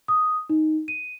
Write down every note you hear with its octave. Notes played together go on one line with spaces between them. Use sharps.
D#6
D#4
D#7